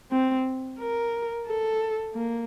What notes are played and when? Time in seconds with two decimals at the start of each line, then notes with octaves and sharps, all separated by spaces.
0.11 C4
0.79 A#4
1.47 A4
2.15 A#3